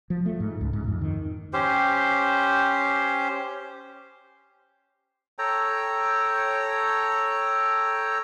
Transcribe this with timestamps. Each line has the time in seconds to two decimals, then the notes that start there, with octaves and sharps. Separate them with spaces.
0.10 F3
0.26 A3
0.40 G#2
0.61 C#2
0.73 G#2
0.88 F2
1.01 D#3
1.53 C#4 G4 C5
5.39 A4 C#5 G5 A#5